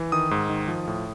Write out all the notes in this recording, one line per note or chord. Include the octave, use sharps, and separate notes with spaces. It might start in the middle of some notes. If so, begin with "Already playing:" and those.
Already playing: E3
D#3 D#6
G#2
D#3
F3
A2